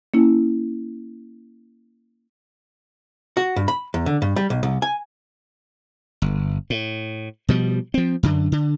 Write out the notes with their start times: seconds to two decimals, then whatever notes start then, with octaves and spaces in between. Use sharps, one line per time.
0.14 A#3 C#4 E4
3.37 F#4
3.56 G2
3.68 B5
3.94 E2
4.06 D3
4.22 G2
4.36 G3
4.50 B1
4.63 C2
4.82 G#5
6.22 G1
6.70 A2
7.49 B2 F3 G3
7.94 F3 C4
8.23 F#2 D3
8.52 D3